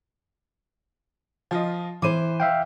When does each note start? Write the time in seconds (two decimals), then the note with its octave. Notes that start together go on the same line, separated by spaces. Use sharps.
1.51 F3 F4 D#5
2.02 E3 C5 D6 D#7
2.40 E5 F5 G5